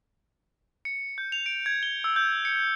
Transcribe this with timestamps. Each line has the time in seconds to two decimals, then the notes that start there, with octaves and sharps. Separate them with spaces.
0.85 C#7
1.18 G6
1.32 F7
1.46 D7
1.66 G#6
1.83 G7
2.04 E6
2.16 G6
2.45 C#7